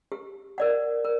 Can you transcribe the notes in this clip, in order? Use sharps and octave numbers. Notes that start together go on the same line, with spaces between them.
G4
A#4 D5 F#5
A#4